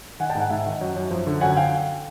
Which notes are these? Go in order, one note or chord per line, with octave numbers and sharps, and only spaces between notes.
D#3 F#5 G#5
G5 A5
G#2 F#5 G#5
G#2 E5 F#5
D#3
F#2
F#2
F3
D3
F#2 F#5 G#5
F5 G5